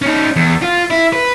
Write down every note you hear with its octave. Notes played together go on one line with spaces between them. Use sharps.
C#4 D#4
E2
F4
E4
B4